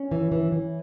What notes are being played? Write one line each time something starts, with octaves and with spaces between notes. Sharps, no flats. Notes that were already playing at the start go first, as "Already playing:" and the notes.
Already playing: C#4
E3
E3
E3